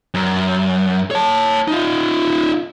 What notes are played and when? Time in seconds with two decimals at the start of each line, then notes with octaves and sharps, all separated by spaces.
0.14 F#2
1.11 C#5 A5
1.68 D#4 F4